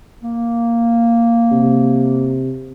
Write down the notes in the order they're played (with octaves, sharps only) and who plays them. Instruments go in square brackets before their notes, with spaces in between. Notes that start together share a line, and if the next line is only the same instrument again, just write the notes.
[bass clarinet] A#3
[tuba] C3